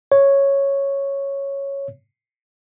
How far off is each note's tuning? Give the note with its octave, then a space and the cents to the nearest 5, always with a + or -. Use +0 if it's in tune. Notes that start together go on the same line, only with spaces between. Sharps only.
C#5 -5